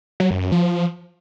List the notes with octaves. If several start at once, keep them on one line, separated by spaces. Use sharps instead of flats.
F#3
F#2
F#2
F3